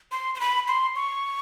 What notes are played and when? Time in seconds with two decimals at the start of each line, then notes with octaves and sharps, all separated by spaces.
0.12 C6
0.35 C6
0.40 B5
0.68 C6
0.96 C#6